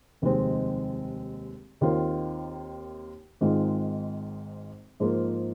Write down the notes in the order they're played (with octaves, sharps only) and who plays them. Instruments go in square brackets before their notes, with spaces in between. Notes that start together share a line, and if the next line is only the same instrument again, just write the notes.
[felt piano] F1 D#2 D#3 G#3 C4
D#2 D#3 C4 F4 A#4
G#1 G#2 D#3 G#3 F4
G#2 F3 A#3 F4